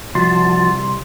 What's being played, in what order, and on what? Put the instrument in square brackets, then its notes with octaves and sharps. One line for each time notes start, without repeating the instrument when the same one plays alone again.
[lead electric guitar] C2 [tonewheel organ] F3 F#4 A5 [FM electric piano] C6